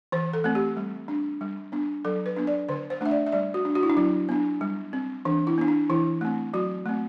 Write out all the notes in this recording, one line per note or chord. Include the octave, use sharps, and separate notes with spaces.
E3 C5
A4
A3 C4
G4
G3
D4
G3
B3 D4
F#3 A4
B4
B3 D4
D5
D3 C5
C5
A3 D4 E5
D5
E5
G3 D5
F#4
D4
F#4
E4
D4
F#3 E4
B3 D4
G3
C4
E3 D4
E4
B3 D4
D4
E3 E4
A3 C4
F#3 F#4
A3 C4